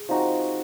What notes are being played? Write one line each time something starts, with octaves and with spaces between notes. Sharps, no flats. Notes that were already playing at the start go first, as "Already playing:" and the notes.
Already playing: G#4
F3 C4 D#4 F#4